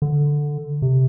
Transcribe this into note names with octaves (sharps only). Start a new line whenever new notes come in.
D3
C3